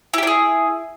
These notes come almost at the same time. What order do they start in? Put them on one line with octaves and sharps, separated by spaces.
E4 G4 D4 G#4